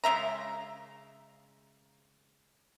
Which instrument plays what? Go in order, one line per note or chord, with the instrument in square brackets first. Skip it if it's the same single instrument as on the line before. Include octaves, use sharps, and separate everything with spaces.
[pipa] C#3 G#3 E5 A#5